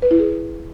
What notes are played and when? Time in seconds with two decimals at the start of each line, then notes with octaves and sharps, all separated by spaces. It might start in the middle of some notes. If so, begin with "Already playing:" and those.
0.02 B4
0.11 E4
0.19 G#4